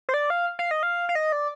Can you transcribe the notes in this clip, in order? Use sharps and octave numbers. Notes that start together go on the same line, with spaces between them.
C5
D5
F5
F5
D#5
F5
F5
D#5
D5